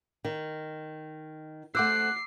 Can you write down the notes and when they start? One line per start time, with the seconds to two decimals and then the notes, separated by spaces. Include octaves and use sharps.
0.25 D#3
1.75 A3 C5 F#5 D6 E6 F#6 C7